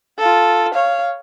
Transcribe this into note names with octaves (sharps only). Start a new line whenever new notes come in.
F4 A4
C#5 F5